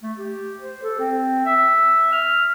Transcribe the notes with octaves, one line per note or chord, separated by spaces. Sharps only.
A3
G4
C5
A4
C4
E5
F6